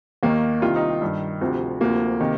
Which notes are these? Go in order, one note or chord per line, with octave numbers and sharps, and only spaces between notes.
D#2 D#3 A#3
C2 C3 D#3 F4
D#4
G2 D#3
D2 C3 F3
D2 C3 F3 A#3
C3 D#3